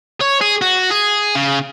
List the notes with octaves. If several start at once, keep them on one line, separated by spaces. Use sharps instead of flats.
C#5
G#4
F#4
G#4
C#3